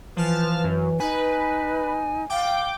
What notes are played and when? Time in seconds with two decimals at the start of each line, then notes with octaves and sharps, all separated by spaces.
0.17 E3 F3 B4 A5 F6
0.64 F#2
1.00 D#4 B4 G#5
2.30 F5 G5 D6